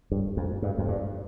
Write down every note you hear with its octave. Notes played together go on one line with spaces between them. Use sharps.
G2
F2
G2
F2
G2